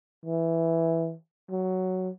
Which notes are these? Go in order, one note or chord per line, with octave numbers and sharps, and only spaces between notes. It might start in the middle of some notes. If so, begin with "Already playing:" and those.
E3
F#3